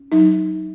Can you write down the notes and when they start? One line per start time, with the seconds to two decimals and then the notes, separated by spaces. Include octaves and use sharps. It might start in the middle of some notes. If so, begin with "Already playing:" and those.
Already playing: C#4
0.12 F#3 D#4